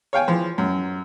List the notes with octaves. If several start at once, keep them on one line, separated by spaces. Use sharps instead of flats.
C#5 F5 G5 G#5
E3 F3
F#2